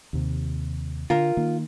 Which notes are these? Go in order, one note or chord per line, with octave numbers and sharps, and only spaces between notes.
D#2 C3
D3 F4 A#4
D#3 A#3